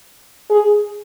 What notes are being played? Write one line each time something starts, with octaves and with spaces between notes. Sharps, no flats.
G#4